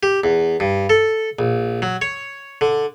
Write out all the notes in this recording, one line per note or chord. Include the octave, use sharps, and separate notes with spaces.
G4
E2
G2
A4
A#1
F#3
C#5
D3